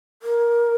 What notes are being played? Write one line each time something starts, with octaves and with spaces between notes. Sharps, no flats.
A#4